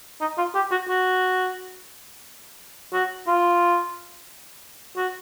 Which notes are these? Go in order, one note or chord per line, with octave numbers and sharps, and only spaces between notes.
D#4
F4
G4
F#4
F#4
F#4
F4
F#4